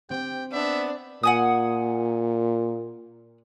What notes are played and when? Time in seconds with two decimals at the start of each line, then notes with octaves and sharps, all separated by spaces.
0.10 C4 G4 G5
0.52 B3 D4 E5
1.23 A#2 F#5 G#5 D#6